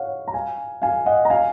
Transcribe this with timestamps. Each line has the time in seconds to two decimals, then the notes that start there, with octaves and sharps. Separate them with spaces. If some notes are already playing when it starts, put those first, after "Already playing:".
Already playing: C#5 F5 F#5
0.28 A#5
0.34 F5 G#5
0.82 F5 G#5
1.06 D#5 F#5
1.25 A#5
1.30 F5 G#5